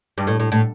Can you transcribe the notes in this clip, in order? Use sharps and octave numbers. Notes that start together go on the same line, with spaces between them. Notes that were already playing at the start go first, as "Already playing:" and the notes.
G2
A2
A2
A2